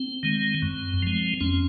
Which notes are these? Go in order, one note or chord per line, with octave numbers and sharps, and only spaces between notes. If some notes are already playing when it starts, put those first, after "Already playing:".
Already playing: C4
D#3 G#3
F#2
F3 G#3
F2 C#4